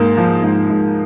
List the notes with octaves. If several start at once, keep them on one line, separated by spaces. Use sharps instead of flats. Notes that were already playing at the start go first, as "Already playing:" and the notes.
Already playing: G#2 A#3
F3
G#2
G#2